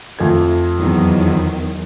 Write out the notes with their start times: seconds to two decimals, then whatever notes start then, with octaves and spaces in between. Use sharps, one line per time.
0.19 F2 A3 G#6
0.76 E2 D#3 F#3